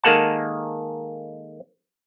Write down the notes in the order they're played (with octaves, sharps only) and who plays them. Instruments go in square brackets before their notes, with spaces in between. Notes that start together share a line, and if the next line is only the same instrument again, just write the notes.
[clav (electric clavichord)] D#3 G#3 A#3 A4 F#5 A5